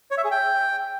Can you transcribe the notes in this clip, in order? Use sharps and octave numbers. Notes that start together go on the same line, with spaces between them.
C#5
E5
G#4
G5